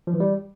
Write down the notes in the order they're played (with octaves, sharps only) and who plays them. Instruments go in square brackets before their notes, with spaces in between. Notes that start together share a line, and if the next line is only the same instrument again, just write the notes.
[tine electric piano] F3
E3
G3